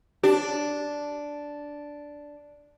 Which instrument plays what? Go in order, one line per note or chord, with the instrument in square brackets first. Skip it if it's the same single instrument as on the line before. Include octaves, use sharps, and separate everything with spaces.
[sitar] D4 [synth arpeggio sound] G4